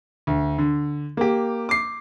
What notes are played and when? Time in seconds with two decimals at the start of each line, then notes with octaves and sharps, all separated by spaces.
0.27 D2
0.58 D3
1.17 A#3 G4
1.69 D6 C7